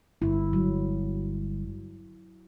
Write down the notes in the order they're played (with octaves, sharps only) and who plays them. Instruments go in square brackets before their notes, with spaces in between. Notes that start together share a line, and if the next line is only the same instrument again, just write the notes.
[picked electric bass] G1 [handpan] E4
[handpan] F#3